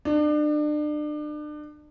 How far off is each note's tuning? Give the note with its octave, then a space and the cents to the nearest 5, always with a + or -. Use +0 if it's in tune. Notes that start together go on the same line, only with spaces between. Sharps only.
D4 +35